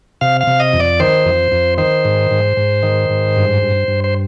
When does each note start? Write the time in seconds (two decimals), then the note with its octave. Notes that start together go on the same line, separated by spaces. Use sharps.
0.21 C3 F5
0.41 F5
0.47 C3
0.60 D#5
0.73 F2
0.80 D5
1.00 D#3 C5
1.26 F2
1.52 F2
1.78 D#3 C5
2.05 G#2
2.31 G#2
2.57 G#2
2.83 D#3
3.10 G#2
3.36 G2
3.62 G2
3.88 G2
4.04 C5